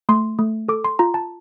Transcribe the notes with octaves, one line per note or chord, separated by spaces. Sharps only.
A3 C6
A3
A4 D6
C6
F4 A#5
A5